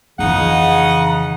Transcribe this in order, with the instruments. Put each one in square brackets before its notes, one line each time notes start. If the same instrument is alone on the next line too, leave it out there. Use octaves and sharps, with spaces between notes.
[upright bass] F2 E3 [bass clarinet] C#3 [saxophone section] D#4 F#5